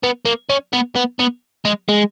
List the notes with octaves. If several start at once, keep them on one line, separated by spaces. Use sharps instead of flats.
B3
A#3
C#4
B3
B3
B3
G#3
G#3